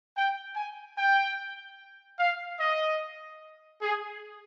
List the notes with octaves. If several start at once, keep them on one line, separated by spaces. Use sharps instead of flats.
G5
G#5
G5
F5
D#5
G#4